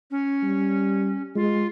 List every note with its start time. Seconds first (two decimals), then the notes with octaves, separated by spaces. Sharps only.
0.11 C#4
0.44 G3
1.36 G#3 F4